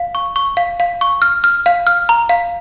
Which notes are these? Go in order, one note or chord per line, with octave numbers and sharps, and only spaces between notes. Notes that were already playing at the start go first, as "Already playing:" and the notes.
Already playing: F5
C#6
C#6
F5
F5
C#6
F6
F6
F5
F6
A#5
F5